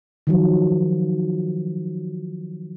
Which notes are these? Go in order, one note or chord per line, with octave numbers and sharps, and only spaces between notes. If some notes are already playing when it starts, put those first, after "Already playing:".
D#3 F3 F#3